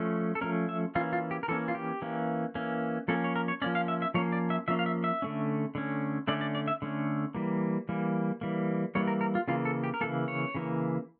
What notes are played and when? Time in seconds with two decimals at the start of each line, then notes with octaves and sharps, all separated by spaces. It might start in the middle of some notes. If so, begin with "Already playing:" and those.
Already playing: F3 A3 C#4
0.35 A4
0.41 F3 A3 C#4 A#4
0.69 E5
0.95 E3 A#3 C#4 F4
1.13 F4
1.31 G4
1.43 A#4
1.48 E3 A#3 C#4 A4
1.68 F4
1.75 G4
2.02 E3 A#3 C#4
2.55 E3 A#3 C#4
3.08 F3 A#3 C#4 A4
3.24 C#5
3.36 A#4
3.48 C#5
3.62 F3 A#3 C#4 D5
3.75 F5
3.88 E5
4.02 E5
4.14 F3 A#3 C#4 C#5
4.32 D5
4.50 E5
4.68 F3 A#3 C#4 E5
4.79 F5
4.86 E5
5.04 E5
5.22 D3 A3 C#4
5.75 D3 A3 C#4
6.28 D3 A3 C#4 D5
6.41 D5
6.55 D5
6.68 E5
6.82 D3 A3 C#4
7.35 E3 G3 A#3
7.89 E3 G3 A#3
8.41 E3 G3 A#3
8.95 E3 G3 A#3 C#5
9.07 A#4
9.21 A#4
9.35 F4
9.48 C#3 E3 A#3 F4
9.65 A4
9.84 G4
9.94 A#4
10.01 C#3 E3 A#3 A4
10.28 C#5
10.55 C#3 E3 A#3